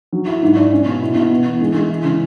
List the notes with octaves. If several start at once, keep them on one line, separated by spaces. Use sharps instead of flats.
F#3
E4
G#2
D4
C#4
B2
E4
B2
B3
E3
G#3
G#3
E3
C#3